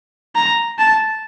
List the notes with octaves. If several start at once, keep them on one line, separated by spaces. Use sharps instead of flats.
A#5
A5